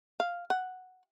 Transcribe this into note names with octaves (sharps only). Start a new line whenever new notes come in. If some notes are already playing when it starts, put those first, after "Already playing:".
F5
F#5